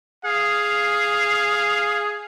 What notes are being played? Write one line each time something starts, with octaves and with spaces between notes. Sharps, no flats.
G#4 F5